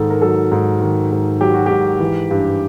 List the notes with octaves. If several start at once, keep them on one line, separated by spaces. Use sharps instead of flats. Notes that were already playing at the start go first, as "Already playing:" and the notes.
Already playing: G#2 D#3 A4
A#4
F#3 A4
G#2
D#3
G#2
F#3 G4
F#4
G#2 G4
E3
G2